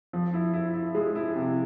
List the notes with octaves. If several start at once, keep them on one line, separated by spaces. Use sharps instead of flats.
F3
E4
E4
E4
G#3
E4
C3